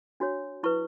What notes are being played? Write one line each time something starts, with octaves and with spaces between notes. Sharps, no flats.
D4 F#4 C#5
E4 B4 C#6